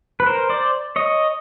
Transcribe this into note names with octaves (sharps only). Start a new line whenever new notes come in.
B4
A#4 C5
C5 D5
C#5 D#5